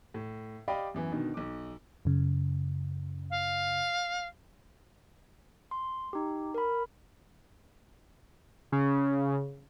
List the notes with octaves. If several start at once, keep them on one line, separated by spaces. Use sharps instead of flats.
A2
G4 D5 D#5 F5 G5 B5
F#2 E3 B3
B2 D3 D#3
B1 D6
F#2 C#3
F5
C6
D#4 G4
A#4 B5
C#3